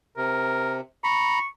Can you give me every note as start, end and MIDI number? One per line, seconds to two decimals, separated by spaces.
0.17 0.81 48
0.17 0.77 70
1.04 1.39 82
1.04 1.39 83
1.04 1.47 85